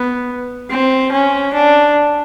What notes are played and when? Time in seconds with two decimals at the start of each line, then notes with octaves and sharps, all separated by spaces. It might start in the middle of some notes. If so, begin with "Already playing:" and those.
Already playing: B3
0.70 C4
1.12 C#4
1.53 D4